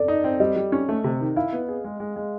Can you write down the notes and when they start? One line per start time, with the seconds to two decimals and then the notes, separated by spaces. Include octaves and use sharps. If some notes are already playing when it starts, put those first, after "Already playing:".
Already playing: A4 D5
0.08 D#4
0.24 C4
0.40 G3 D#5
0.56 G3
0.72 C#4
0.89 A3
1.04 C3
1.20 D#3
1.36 E4 F5
1.52 B3
1.68 G#4
1.84 G#3
2.00 G#3
2.16 G#3